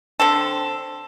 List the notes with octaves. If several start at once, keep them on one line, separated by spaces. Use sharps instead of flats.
D3 C4 A4